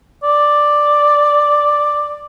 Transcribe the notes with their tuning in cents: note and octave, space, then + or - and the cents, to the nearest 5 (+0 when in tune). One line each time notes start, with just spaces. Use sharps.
D5 +5